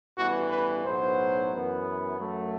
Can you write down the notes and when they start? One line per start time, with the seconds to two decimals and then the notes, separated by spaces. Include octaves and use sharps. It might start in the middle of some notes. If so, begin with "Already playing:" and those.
0.16 A1 G2 E3 B3 F#4
0.50 B4
0.83 B1 A2 F#3 B3 C5
1.51 F#2 E3 B3
2.19 F#2 F#3 A3